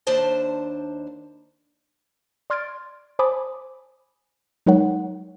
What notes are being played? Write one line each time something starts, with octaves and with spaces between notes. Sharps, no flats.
D#2 D4 C5 A5
D5 C6 F6 G#6 A6 D7
C5 G#5 A5 B5 D6 D#6
F#3 G#3 D#4 A#4 C#5 F#5